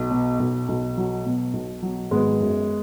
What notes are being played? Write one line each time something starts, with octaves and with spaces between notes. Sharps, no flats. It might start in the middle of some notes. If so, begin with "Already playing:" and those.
Already playing: B1
B2
B1
B1
F#3
B2
B1
F#3
G#1 G#3 B3
F#2